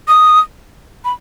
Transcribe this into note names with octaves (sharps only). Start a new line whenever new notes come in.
D#6
B5